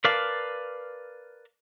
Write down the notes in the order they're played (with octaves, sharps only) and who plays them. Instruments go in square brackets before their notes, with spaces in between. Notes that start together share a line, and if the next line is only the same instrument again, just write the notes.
[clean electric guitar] A#4 B4 D5 F5 A5